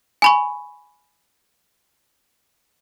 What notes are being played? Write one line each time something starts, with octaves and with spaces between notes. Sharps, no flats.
G#5 B5 C#6